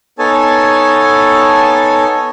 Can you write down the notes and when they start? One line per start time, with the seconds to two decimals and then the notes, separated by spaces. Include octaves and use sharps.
0.19 B3 D#4 A4 C#5 G#5 A5